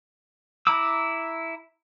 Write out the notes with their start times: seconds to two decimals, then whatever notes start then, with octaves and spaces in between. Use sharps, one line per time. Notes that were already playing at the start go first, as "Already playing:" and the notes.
0.67 E4 A#5 B5 D6 E6